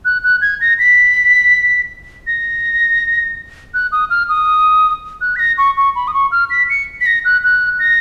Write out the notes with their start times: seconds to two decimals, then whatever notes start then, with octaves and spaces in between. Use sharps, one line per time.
0.05 F#6
0.24 F#6
0.42 G#6
0.61 A#6
0.79 B6
2.27 A#6
3.74 F#6
3.92 D#6
4.10 F6
4.29 D#6
5.21 F#6
5.36 B6
5.39 A#6
5.58 C#6
5.77 C#6
5.96 B5
6.08 D#6
6.14 C#6
6.32 F6
6.50 B6
6.70 C#7
7.01 B6
7.06 A#6
7.25 F#6
7.43 F#6
7.79 A#6